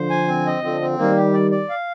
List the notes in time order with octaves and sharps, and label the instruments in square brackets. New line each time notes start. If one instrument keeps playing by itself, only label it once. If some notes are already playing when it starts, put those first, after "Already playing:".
Already playing: [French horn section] D3 F3 [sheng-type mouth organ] C5
[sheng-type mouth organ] G#5
C4
D#5
[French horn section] D3 F3 [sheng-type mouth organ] C4
[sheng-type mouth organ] C4
[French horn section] D#3 G3 [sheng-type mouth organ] A#3
[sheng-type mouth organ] G4
D5
D5
F5